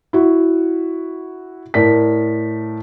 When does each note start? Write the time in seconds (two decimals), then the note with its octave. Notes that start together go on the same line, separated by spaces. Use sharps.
0.13 E4 F#4
1.74 A2 A#4 D5 B6